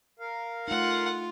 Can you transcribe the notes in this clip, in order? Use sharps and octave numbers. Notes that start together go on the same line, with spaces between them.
A#4 F5
A3 D#4 F4 F#5